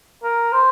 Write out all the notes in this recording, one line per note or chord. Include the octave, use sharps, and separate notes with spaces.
A#4
C5